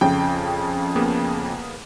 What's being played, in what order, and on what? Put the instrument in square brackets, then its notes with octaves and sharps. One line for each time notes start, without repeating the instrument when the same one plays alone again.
[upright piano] F2 C#3 [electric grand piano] G5
[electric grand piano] A#3 B3 G#4